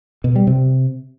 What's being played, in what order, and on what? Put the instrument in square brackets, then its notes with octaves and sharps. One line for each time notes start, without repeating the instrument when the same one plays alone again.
[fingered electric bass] B2
G3
C3